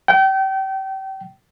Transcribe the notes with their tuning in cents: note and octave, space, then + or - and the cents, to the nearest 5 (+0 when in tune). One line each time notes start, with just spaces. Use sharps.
G5 -30